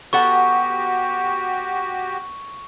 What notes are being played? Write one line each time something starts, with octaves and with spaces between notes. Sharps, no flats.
B3 F#4 G4 A4 F#5 C#6